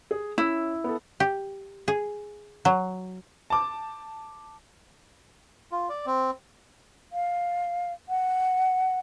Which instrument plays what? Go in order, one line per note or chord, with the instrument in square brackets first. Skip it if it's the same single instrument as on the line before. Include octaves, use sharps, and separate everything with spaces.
[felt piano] G#4
[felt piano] C#4 E6 [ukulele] E4
[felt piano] B3 A4
[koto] G4
G#4
F#3
[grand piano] A5 D6
[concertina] F4
D5
C4
[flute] F5
F#5